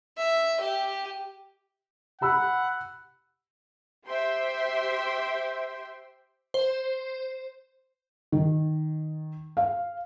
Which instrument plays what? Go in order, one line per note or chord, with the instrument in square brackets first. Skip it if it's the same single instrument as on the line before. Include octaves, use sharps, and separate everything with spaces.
[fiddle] E5
G4
[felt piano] G4 B5 E6 [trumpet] F#5
[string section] G4 C5 E5 G5 C6
[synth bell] C5
[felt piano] D#3
F5